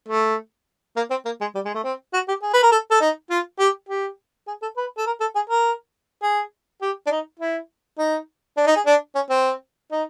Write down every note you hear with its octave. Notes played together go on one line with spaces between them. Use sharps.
A3
A#3
C4
A#3
G#3
G3
G#3
A3
C4
F#4
G4
G#4
B4
A#4
A4
A4
D#4
F4
G4
G4
G#4
A4
B4
A4
A#4
A4
G#4
A#4
G#4
G4
D4
D#4
E4
D#4
D4
D#4
G#4
D4
C#4
C4
D#4